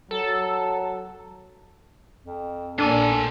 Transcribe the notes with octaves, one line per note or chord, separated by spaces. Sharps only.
F#3 A4
F2
A#1 A#3 C4 D4 A4 G#5